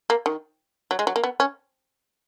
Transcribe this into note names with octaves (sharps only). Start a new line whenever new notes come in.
A#3
D#3
F#3
G#3
F#3
A#3
B3
C#4